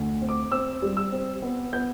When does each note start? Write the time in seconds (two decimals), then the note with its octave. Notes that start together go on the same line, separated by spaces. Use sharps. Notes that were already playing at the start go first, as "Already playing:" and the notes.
Already playing: D2
0.22 C4
0.29 D6
0.51 C4 E6
0.82 G3
0.97 E6
1.12 C4
1.42 B3
1.73 B3 G6